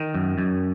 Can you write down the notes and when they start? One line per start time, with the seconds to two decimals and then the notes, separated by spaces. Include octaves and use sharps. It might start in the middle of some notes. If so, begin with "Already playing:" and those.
Already playing: D#3
0.15 F#2
0.38 F#2